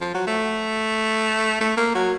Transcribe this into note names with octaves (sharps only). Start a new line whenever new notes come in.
F3
F#3
A3
A3
A#3
F#3